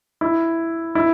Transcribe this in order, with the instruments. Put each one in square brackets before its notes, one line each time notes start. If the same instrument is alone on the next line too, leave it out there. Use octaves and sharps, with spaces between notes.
[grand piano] E4
E4